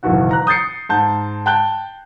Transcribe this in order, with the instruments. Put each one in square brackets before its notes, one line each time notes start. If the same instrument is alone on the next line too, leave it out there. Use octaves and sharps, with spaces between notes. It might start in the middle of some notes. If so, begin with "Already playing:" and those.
[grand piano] F#1 B2 D#3 E3 F#4 F#5
A#5 F#6
D#6 G6 A6 C7 C#7
G#2 A5 G6
G5 A5 F#6 G6 G7